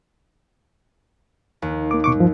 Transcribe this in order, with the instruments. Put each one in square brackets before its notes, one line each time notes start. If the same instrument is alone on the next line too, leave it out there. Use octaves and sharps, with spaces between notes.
[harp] D#2
[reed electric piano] A#3 D6
B2 C#6 D6
G2 F3